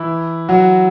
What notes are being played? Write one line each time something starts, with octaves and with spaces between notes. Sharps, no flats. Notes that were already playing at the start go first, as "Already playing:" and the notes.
Already playing: E3 E4
F#3 F#4